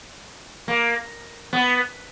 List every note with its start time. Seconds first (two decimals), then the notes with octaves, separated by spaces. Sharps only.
0.68 A#3
1.53 B3